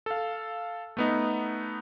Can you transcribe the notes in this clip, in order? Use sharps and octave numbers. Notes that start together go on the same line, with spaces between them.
A4 F5
A3 B3 D#4